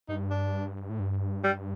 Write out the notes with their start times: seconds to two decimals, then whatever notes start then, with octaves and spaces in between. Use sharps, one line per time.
0.09 G2 D#4
0.31 D4
0.90 A2
1.00 G2
1.44 G3